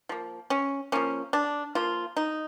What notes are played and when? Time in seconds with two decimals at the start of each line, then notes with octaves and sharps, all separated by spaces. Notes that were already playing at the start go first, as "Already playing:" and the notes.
0.09 F3 A#3
0.50 C#4
0.92 F3 A#3 C#4
1.33 D4
1.75 F3 A#3 F4
2.17 D#4